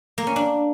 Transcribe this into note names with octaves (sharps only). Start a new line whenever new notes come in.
A#3
C#4
D4